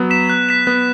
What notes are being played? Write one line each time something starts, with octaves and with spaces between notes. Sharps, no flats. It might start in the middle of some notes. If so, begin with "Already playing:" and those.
Already playing: F#3 B3
B6 E7
F#6
B6 E7
B3 F#6